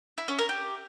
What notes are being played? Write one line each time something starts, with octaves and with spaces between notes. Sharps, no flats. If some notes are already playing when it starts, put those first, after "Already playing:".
E4
C#4
A#4
G4